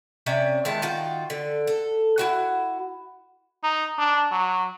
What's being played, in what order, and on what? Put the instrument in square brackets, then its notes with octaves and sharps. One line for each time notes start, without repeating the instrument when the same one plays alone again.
[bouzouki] C3 C#4 D5 E5
D#3 G#3 E4 A5
D#3 F4 F#4
D3
A4
E4 F#4 F#5
[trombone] D#4
D4
F#3